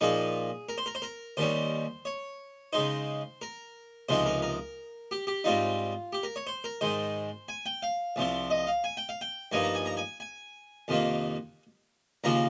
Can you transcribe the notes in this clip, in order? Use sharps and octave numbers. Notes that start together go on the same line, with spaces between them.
A#2 F3 A#3 D#4 G#4
A#4
C5
A#4
C5
A#4
D#2 D#3 G3 C#4 C5
C#5
C#3 G#3 D#4 C5
A#4
C#2 C3 F3 G#3 D#4 C5
A#4
A#4
G4
G4
G#2 G3 C4 D#4 F4
G4
A#4
C#5
C5
A#4
G#2 D#3 G#3 C5
G#5
G5
F5
C2 C3 F3 C4
D#5
F5
G#5
G5
F5
G5
G2 F3 A#3 D#4 G#5
A#5
G#5
A#5
G#5
G#5
F2 C3 D#3 A#3 F4
D#2 C#3 F3 A#3 F4 A#5